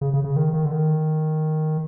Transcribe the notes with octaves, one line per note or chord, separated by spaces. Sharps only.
C#3
C#3
C#3
D#3
D#3
D3
D#3